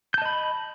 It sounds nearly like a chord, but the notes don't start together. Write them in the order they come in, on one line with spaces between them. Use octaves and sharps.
G6 A5 D#5 B5